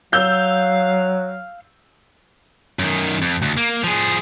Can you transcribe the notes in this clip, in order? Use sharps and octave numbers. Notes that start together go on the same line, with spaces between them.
F#3 F5 E6 G6
F#2 D#3
F2
D2
A#3
F3 G#4